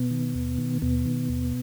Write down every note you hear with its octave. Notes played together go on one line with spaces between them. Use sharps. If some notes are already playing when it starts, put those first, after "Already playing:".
Already playing: B2 B3
D#3
D#2
D#3
D#2 B2 B3
D#3
D#2